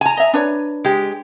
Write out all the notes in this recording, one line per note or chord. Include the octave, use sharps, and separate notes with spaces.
G#5 A#5
D#5 E5
D4 B4 C#5
G#3 G4